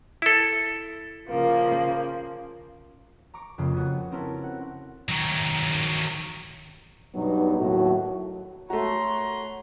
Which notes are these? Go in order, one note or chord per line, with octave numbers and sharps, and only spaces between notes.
E4 A4
C#3 F3 A#3
A#5 C#6 D6
F2 C#3 A#3
B3 F#4
C4 C#4 E4 A4 A#4
F#5
D#3 F#3
G2 B2 F#3 B3 D#4
D#2 A2 F#3 A3 F#4
A3 F#4 C#5 A#5 C6